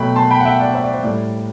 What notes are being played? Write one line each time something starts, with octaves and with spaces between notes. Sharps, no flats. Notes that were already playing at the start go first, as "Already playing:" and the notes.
Already playing: B2 F#3 A3 G5 B5
A5 C6
G5 B5
F#5
E5 G5
D5 F#5
C5 E5
D5
C5
A2 G3 D5